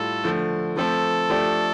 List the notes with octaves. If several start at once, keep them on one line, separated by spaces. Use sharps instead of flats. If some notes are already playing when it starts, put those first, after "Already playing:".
Already playing: A2 G3 F4 A4
D3 F3 A3
F3 A3 C4 A4
F3 A3 D4 G4